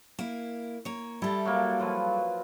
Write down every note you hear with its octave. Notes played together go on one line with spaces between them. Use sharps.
A#3 E4
A#3 C#5
G3 E4 A4 A5
F#3 A#3
F3 F#3 B4